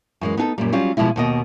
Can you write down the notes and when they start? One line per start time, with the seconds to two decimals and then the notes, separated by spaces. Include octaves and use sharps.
0.21 F#2 E3 G#3
0.37 B3 D#4 G#4 A4
0.58 F#2 A#2 G3
0.72 F#3 G3 C#4 F4
0.97 B2 F3 G3 G#3 E4
1.16 D#2 B2 D#5